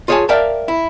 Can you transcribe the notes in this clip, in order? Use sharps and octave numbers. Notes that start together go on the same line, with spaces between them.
F4 G#4 C#5 F#5 G#5 A5
A#4 D5 E5 F5 G5 A5
E4